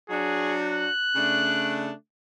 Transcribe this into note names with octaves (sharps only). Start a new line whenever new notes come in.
F#3 D4 F#4 G#4
F#6
C#3 A3 D4